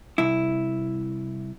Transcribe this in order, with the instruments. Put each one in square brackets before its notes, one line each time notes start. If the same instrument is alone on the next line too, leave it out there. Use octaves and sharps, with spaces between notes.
[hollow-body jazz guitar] C2 E4